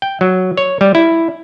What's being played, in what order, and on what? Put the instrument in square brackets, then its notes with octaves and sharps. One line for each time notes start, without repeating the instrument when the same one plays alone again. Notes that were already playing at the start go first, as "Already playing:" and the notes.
[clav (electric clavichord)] G5
F#3
C#5
G3
E4